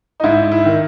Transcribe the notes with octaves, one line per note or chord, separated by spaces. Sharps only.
D#4
G#2 E4
E4
D#3